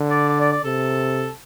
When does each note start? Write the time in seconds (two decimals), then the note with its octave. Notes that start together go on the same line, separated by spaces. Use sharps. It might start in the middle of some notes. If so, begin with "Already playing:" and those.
Already playing: D3
0.10 D5
0.29 D5
0.40 D5
0.52 D5
0.64 C3 A4